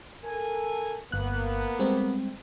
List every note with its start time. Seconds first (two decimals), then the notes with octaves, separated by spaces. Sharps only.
0.24 A4 A#4 G#5
1.12 G1 A#3 B3 F#6
1.79 G3 G#3 C4